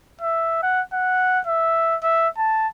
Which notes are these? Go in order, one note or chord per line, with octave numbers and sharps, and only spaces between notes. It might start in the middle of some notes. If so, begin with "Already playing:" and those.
E5
F#5
F#5
E5
E5
A5